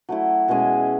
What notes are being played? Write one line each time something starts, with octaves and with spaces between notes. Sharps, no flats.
F#3 A3 E4
B2 G#3 C#4 G#4